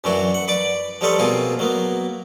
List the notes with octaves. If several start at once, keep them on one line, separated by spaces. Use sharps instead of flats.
F#2 E3 F#3 D4 F#4
F#5
B4 D5 D6
F3 G3 D#4 A4 B4 C#5
B2 A#3 C4 F4 G#4
F#3 A#3 B3